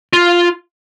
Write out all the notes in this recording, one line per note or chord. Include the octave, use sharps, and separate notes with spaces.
F4